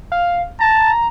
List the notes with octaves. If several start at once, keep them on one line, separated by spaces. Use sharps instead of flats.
F5
A5 A#5